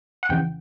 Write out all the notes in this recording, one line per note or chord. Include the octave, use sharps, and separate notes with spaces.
F#5
F2 C#3 E3 G5